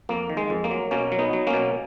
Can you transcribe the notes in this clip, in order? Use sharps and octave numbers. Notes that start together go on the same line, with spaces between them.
F2 A#3
D#3
G#3
F2
A#3
F#3
B2 A#3 C#4
F#3
B3 D#4
F#3
A#3 C#4
B2